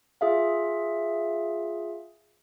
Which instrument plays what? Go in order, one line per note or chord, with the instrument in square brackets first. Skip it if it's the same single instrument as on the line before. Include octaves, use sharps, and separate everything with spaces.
[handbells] F4 G#4 E5 F5